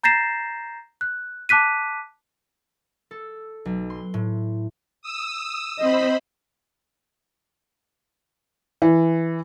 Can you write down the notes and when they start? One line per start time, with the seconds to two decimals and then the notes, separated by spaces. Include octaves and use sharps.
0.03 A#5 G6 A6 A#6 C7 E7
1.01 F#6
1.49 A5 D6 F#6 B6 D#7
3.11 A4
3.65 B1
3.90 C6
4.14 A2
5.02 D#6 E6
5.79 C4 C5 D#5 B5
8.82 E3